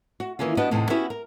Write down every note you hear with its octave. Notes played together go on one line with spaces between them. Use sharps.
F#4
D#3 E3 A#3 C#4 F4
B3 D4 F#4 G4 B4 D#5
E2 A2 C3 D#4
B3 C#4 E4 F#4 G4 B4
A#4